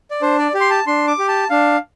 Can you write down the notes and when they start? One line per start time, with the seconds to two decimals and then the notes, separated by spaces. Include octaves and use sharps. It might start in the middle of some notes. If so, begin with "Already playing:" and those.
0.11 D5
0.22 D4 C5
0.39 D5
0.54 G4
0.60 C6
0.70 A5
0.87 D4 C6
1.07 D6
1.19 G4
1.28 A5
1.50 D4 F5